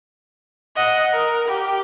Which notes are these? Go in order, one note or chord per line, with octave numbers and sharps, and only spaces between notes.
D#5 F#5
A#4
G4